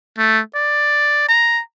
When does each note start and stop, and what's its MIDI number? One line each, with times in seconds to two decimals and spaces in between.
0.18 0.41 57
0.55 1.24 74
1.29 1.61 82